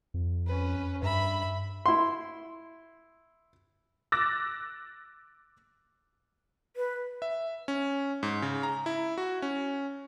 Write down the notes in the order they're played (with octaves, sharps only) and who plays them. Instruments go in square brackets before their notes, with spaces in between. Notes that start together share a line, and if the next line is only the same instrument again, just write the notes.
[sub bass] F2
[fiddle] C#4 B4
[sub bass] G2 [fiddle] E5 B5
[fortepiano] E4 C6
[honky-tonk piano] D6 E6 F#6 A6 A#6
[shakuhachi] B4
[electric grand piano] E5
C#4
G#2
C#3
A#5
E4
F#4
C#4